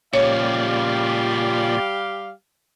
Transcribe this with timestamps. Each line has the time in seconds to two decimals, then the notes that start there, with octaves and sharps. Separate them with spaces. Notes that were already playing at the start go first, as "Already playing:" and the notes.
0.13 A#2 C#3 F3 G3 G4 C#5 D5 F5